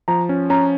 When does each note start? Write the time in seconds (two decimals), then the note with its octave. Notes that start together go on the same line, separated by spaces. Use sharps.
0.08 F3 A#5
0.29 C#4
0.50 C#4 A#5